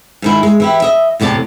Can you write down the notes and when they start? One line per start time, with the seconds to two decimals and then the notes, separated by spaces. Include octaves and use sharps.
0.22 G#2 D#3 E4
0.43 G#3
0.60 E3 E4 G4
0.82 D#5 E5
1.20 E2 A2 C3 D5 A5